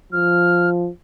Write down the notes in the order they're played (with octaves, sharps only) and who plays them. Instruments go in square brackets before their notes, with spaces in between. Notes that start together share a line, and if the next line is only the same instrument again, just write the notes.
[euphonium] F3 [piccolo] F6